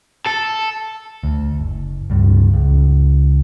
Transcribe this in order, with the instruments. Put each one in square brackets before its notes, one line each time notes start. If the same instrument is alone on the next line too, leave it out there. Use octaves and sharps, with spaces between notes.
[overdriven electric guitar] A4
[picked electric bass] D2
F#1
C#2 G2
C#2